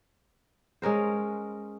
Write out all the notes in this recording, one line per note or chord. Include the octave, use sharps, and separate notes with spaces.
G#3 C#4 A#4 C5